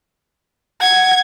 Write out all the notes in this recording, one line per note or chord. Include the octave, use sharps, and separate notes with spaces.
F#5 G#6